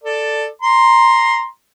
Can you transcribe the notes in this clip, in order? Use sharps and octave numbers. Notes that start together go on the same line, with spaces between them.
A4 D5
A#5 C6